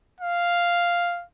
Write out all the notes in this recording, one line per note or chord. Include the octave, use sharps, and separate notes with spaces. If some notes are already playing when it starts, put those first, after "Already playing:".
F5